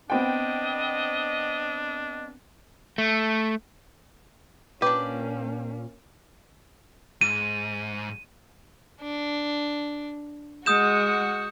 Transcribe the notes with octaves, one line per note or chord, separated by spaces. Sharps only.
B3 C4 D4 D#5 G5
A3
A#2 A#3 C#4 D4 G4 B4
G#2 D#7
D4
G#3 F#4 F#5 D#6 G6 E7